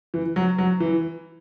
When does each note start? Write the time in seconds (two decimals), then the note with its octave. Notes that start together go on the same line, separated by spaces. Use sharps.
0.14 E3
0.36 F#3
0.58 F#3
0.80 E3